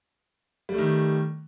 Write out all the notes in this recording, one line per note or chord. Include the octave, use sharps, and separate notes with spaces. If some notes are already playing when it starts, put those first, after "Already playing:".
D#3 G3 A3